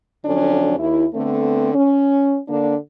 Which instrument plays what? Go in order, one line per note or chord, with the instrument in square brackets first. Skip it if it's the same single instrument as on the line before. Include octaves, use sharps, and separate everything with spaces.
[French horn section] F2 D3 F#3 C#4 D4
D#2 E4
D3 A3 B3 C4
C#4
D3 A#3 D4